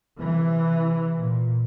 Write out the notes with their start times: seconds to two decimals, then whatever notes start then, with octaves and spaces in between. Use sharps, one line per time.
0.19 C3 E3
1.16 A#2